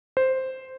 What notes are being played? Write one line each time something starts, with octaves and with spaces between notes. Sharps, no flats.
C5